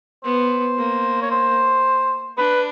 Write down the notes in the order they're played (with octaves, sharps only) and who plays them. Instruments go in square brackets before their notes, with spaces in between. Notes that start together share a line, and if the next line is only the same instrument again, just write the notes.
[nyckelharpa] B3 [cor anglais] C5
[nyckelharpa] A#3
[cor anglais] C#5
C5
[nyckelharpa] D4 [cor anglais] B4